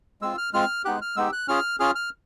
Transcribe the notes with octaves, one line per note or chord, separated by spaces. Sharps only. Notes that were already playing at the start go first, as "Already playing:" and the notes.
G#3 C4 F4 E6
F6
G#3 C4 F4 F6
G#3 B3 D#4 G4 F#6
F6
G#3 B3 D#4 G4 E6
F#6
C#4 F4 G#4 F6
C#4 F4 G#4 F6
F6